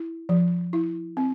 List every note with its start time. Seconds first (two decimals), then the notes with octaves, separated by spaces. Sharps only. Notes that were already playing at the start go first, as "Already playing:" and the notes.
Already playing: E4
0.29 F3
0.73 E4
1.17 C4